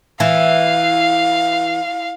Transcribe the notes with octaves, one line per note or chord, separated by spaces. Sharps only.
E3 F5